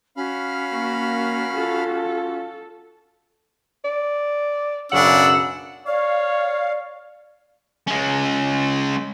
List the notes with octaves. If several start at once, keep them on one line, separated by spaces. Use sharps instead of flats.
C#4 F#4 F5 B5 F6
A#3 A#4
F4 A4
D5
B1 F#2 C#3 D4 F#5 E6
C#5 D5 F5
G#3 C#4